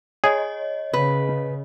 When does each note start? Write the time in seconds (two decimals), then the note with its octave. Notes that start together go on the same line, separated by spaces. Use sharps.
0.24 G#4 C#5 D#5
0.93 C#3 B4